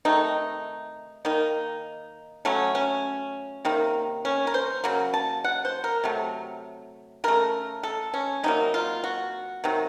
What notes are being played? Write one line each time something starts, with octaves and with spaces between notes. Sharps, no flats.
C3 D#3 A3 D#4
D#3 A#3 D#4
C#3 F#3 A3 C#4
C#4
C3 D#3 A#3
C#4
A#4
C5
C#3 F#3 A#3
A5
F#5
C5
A#4
C3 F#3 A3
C#3 A3 A#4
A4
C#4
C3 F#3 A#3 D#4
F4
F#4
C3 D#3 F#3